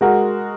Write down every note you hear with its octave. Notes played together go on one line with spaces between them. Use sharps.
G#3 F#4 A#4